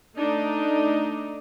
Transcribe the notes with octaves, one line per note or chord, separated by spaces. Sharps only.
A3 D4 D#4